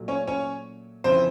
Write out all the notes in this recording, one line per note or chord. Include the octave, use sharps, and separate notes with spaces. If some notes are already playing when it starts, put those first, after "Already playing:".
Already playing: A#2 F#3 A3
C#4 C#5
C#4 C#5
F2 C#3 E3 C4 C5